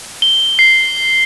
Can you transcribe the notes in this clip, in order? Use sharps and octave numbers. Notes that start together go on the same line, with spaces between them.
G7
C7